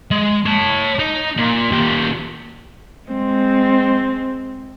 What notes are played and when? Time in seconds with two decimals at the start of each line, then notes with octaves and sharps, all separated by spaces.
0.11 G#3
0.46 C#5 A5
0.99 D#4
1.37 A#2
1.71 A#2 G4
3.09 G#3 C4